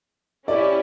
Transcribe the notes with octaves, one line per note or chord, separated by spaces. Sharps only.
C#4 E4 G4 D5